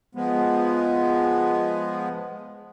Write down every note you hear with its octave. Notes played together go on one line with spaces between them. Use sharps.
F3 G#3 B3